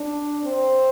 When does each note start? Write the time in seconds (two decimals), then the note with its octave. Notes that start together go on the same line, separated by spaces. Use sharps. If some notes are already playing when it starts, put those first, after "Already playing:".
Already playing: D4
0.45 C4